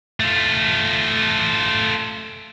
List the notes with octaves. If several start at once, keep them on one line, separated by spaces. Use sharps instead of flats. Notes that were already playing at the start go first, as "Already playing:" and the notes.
A3 F4